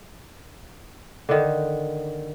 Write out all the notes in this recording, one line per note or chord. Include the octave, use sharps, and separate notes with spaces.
D3 D#3